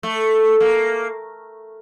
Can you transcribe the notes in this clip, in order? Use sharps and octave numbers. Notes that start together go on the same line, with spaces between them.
A3
A#3